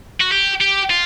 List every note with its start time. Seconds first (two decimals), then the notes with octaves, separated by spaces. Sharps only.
0.21 F#4
0.32 G4
0.61 G4
0.90 F4